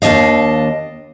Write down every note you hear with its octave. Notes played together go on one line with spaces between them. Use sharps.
D#2 E3 D4 D#5 F5